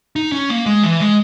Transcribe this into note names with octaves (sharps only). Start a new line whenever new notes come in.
D#4
C#4
A#3
G#3
E3
G#3